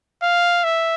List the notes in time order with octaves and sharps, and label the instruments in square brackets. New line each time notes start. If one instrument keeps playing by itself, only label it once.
[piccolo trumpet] F5
E5